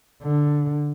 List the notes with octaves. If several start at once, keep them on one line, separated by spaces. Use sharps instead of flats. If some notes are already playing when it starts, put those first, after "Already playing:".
D3